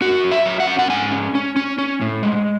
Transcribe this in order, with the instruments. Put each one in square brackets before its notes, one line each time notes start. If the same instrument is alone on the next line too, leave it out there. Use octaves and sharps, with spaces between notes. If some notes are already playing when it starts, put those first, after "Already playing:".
[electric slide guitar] C#4 F#4
F#3
E5
F#3
F#5
C#4
F#5
G#2 G#5
C#4
C#4
C#4
C#4
A2
G#3